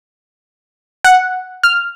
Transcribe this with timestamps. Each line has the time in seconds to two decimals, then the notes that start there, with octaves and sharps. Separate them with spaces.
1.04 F#5
1.63 F6